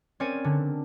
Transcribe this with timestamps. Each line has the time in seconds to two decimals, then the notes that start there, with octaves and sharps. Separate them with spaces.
0.20 C4 C#4 A#4 C#5 D5 D#7
0.44 D3